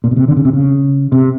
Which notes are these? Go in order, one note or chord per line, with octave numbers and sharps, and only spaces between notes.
A#2
B2
C3
D3
C#3
C3
C#3
C3